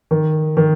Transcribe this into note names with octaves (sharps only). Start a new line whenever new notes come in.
D#3
D#3